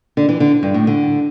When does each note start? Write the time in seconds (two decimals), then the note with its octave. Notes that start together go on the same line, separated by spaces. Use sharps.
0.17 D3
0.29 E3
0.40 D3
0.63 G2
0.74 A2
0.87 D3